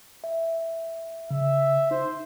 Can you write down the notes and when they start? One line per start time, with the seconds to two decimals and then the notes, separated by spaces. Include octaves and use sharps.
0.24 E5
1.31 C#3 E5
1.91 D#4 C5